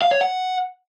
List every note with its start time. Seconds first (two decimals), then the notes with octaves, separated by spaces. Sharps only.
0.02 F5
0.11 C#5
0.21 F#5